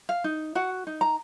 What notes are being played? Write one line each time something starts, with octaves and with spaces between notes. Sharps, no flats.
F5
D#4
F#4 F#5
D#4
A#5